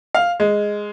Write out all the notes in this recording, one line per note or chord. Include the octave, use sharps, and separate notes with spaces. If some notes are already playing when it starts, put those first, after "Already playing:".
F5
G#3